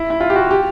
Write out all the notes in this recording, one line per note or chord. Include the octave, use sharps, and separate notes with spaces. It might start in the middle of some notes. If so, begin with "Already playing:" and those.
Already playing: E4
E4
F4
G4
F#4
G4